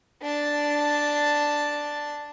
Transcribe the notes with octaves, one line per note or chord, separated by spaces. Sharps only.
D4 A5